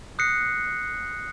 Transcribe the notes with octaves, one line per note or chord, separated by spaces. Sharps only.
D#6 F#6 G6 A#6 C7 C#7